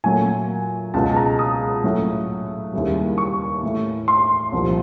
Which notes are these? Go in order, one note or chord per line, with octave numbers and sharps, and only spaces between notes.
A#2 F#3 A3 G#5
C#2 B2 G#3 A5
A5
A#5
D#6
A2 F#3 A3
D#2 C#3 E3 G3
C#6
A2 E3 A3
C6
C2 A#2 F3